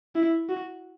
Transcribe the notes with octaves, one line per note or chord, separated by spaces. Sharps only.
E4
F#4